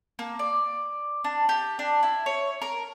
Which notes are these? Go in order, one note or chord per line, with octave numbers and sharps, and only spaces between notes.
A#3
D5
D4
G4
D4
E4
C#5
A#4